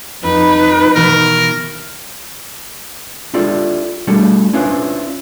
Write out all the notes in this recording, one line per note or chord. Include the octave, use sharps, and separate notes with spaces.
F2 D#4 B4
B2 D#3 E3 A#4
D4 E4 F4 G4 A4 D5
G3 A3 D4 F#4 A4 F#5
C#4 D4 E4 F4 B4 C5